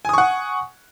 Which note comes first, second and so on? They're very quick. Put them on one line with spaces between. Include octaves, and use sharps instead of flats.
G#5 D#6 C#6 F#5